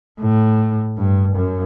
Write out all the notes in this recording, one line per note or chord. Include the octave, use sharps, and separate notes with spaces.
A2
G2
F#2